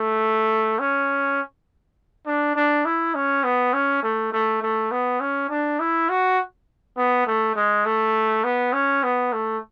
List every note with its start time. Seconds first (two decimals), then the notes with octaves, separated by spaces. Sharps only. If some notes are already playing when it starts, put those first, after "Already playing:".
Already playing: A3
0.79 C#4
2.26 D4
2.56 D4
2.85 E4
3.15 C#4
3.44 B3
3.73 C#4
4.03 A3
4.32 A3
4.62 A3
4.91 B3
5.20 C#4
5.50 D4
5.80 E4
6.09 F#4
6.97 B3
7.26 A3
7.56 G#3
7.85 A3
8.44 B3
8.73 C#4
9.03 B3
9.32 A3